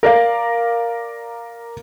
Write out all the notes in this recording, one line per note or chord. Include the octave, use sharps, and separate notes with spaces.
A#4 D5 F5